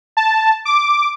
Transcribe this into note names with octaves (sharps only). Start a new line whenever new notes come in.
A5
D6